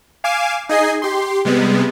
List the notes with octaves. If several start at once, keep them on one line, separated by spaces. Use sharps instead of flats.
F5 G#5 D6 C7 E7
D#4 G#4 D#5 G#5 C7
G4 C6
C3 G3 G#3 B3